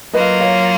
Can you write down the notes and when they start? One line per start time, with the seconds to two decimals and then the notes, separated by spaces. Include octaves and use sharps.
0.13 F#3 A#3 F4 B4 D#5
0.40 C#5 F5